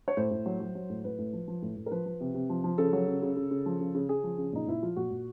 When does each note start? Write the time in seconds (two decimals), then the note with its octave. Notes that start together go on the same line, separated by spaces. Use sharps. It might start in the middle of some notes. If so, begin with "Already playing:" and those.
0.08 C#5
0.17 A2 C5
0.31 A2
0.46 F#3
0.60 F#3
0.75 F#3
0.89 A2
1.04 A2 B4
1.18 A2
1.33 F3
1.48 F3
1.62 A2
1.76 A2
1.86 A#4
1.91 F3 B4
2.06 F3
2.21 C3
2.34 C3
2.50 F3
2.64 F3
2.78 C#3 A4
2.93 F#3
3.08 C#3
3.22 C#3
3.36 C#3
3.51 C#3
3.66 F3
3.80 C#3
3.95 C#3
4.09 C#3 G#4
4.24 F3
4.38 C#3
4.53 A#2 D#4
4.67 A#2 E4
4.82 F3 F4
4.96 A#2 F#4
5.11 A#2